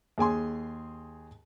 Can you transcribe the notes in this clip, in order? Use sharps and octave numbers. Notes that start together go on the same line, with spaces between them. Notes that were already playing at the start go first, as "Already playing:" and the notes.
D#2 G#4 G#5 C6